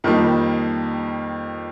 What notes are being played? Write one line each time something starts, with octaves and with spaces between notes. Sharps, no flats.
F2 D#3 G3 A#3 D#4